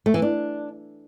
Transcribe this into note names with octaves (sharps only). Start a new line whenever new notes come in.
A3
E3
D4